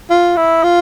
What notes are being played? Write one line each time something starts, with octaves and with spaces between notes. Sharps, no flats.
F4
E4
F4